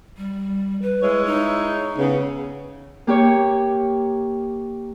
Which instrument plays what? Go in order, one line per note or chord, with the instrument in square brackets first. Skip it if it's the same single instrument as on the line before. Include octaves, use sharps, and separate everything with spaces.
[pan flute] G3
B4
[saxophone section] G#3 E4 C#5
[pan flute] D#4
[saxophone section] C#3 B3
[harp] A#3 G4 C#5